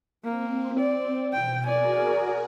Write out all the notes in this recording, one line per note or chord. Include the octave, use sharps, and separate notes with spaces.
A#3 C4
D5
B2 G5
F#4 G#4 A#4 D5 G#5